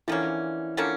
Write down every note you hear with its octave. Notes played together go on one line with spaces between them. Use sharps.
D3 E3 F3 A#3 C#4
D3 F3 A#3 C#4